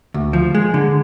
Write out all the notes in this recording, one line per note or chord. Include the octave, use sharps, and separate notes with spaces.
D2
F3
G#3
D3